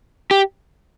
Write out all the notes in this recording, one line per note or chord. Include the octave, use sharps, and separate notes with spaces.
G4